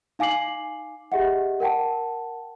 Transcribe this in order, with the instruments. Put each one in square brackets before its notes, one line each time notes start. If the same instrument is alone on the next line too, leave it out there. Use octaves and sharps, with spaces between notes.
[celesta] D#4 F5 G#5 D6 C7 F#7
G4 G#4 D#5 E5 F#5
A#4 F#5 G5 A5